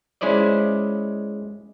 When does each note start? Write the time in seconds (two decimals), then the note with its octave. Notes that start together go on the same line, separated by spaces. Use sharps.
0.21 G#3 C#4 E4 C5 D5 D#5